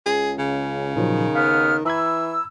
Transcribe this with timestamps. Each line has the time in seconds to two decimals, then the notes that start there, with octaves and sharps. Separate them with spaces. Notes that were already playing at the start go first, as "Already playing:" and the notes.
0.06 C#2 G#4
0.39 C#3
0.96 A#2 D#3 F3 F#3
1.35 D#2 B3 F5 F6
1.85 E3 A#5 B5 E6 G#6